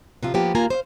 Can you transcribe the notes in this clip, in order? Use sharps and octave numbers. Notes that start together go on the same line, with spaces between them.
C3 F3 F4
F3 A#3 B3 F4 G4
D#2 A#3 F4 G#5 A#5
C5 D#5 F5